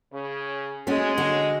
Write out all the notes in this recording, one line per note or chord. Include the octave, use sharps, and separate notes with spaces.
C#3
G#3 A3 C#4 F#4
D3 F#4